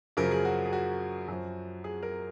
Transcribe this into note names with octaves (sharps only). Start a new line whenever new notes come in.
F#2 C#3 F3 A#4
G#4
F#4
G#4
F#4
F#2 F3
G#4
A#4